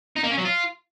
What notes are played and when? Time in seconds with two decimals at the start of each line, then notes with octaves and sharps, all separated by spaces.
0.17 D#4
0.24 A#3
0.31 C#4
0.38 F#3
0.45 F4